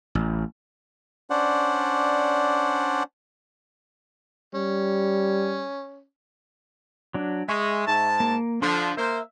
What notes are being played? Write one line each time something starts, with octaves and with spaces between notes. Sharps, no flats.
A1
C#4 D4 C5 D5 F#5
G3 C#4
F#3 D4
G#3 E5 C#6
G#2 A5
A#3
D3 F3 D4 C6
A#3 A#4 C5 E5